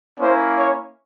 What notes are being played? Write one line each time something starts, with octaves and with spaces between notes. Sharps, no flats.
A#3 C#4 E4 C5
C#5